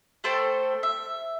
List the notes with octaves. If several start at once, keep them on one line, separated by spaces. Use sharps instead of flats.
A3 A4 C5 G5
E5